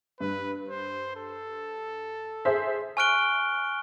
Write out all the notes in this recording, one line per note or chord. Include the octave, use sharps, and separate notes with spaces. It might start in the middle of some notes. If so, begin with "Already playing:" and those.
G2 B4
C5
A4
G#4 C5 E5
G#5 C#6 F6 F#6 D7 G7